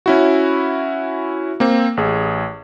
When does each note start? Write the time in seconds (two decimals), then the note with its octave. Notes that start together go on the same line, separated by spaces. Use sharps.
0.06 C#4 E4 F#4
1.60 A#3 C4
1.97 A1 G#4